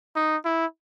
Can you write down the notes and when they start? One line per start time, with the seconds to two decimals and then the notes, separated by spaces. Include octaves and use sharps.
0.16 D#4
0.45 E4